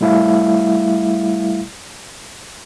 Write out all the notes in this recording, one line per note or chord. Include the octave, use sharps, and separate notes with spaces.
G3 A3 E4 E5 F5